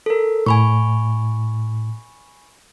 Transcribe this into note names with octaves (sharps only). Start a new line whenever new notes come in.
A4 A#4
A2 G#5 B5 C#6